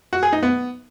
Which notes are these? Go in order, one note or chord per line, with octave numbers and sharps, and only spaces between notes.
F#4
G#4
D#4
B3